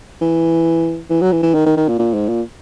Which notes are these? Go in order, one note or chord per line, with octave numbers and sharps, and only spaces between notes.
E3
E3
F#3
E3
E3
D#3
D#3
D#3
A#2
A#2
G#2
A#2